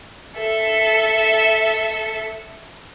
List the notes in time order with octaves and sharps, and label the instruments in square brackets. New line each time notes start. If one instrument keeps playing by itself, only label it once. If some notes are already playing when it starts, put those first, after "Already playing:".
[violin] A4 E5